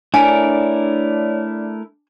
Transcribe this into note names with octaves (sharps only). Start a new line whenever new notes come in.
A3 D4 E4 A#4 C#5 D5 G#5